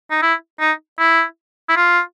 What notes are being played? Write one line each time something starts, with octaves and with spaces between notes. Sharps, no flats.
D#4
E4
D#4
E4
E4
F4